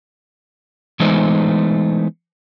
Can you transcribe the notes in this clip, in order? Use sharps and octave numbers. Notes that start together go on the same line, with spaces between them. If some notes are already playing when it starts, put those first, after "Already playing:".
E3 G#3 A3 B3 D#4 C5